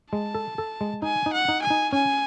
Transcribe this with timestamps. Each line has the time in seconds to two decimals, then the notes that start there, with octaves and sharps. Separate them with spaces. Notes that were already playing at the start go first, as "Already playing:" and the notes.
0.12 G#3 A5
0.35 A4
0.58 A4
0.81 G#3
1.02 D#4 G#5
1.26 D#4
1.33 F#5
1.48 D#4
1.63 G#5
1.70 D#4
1.93 C#4 G#5